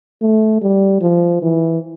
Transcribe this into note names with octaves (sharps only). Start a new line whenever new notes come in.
A3
G3
F3
E3